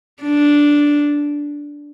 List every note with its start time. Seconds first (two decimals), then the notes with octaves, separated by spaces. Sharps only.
0.23 D4